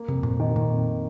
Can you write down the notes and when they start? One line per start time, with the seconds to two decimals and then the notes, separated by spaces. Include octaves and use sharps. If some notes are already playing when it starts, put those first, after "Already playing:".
Already playing: A#3
0.08 F2 C3
0.23 F2 A#2
0.40 D#3
0.56 A#2 A#3
0.71 F2